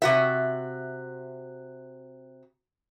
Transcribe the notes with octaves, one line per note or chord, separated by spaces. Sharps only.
C3 F#4 E5